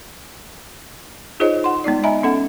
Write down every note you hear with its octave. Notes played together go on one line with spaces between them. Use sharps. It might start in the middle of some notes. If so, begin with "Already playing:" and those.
D#4 F4 G#4 C5 C#5 D#5
F#5 C6
G#3 B3 D#4 D5
D#5 E5 G#5 A#5 B5
B3 C#4 A4 F#5